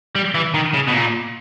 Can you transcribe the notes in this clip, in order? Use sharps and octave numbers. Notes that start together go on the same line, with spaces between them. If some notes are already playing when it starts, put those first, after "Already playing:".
G3
E3
D#3
C#3
B2
A#2